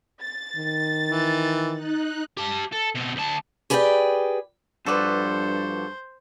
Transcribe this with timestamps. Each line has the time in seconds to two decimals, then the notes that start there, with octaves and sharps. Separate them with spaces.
0.21 A6
0.57 D#3
1.09 E3
1.72 D#4 F#6
2.37 G4 A5
2.72 A4
2.95 B2 C4
3.16 D2 A5
3.70 G4 G#4 B4 D5 F5 G5
4.86 G2 F3 F#4 A4 B4 C5 D5